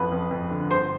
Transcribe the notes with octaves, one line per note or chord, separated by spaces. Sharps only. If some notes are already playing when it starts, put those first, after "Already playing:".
Already playing: A1 F2 B4 B5
F2
F2
D3
G1 C5 C6